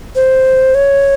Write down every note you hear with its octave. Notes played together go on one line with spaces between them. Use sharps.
C5
C#5